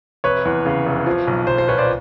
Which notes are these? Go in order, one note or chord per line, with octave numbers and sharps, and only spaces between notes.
F1 B4 C#5
E2
C#3
F1
F3
B1
B1 C5
C5
A#2 B4 C#5
C5 D5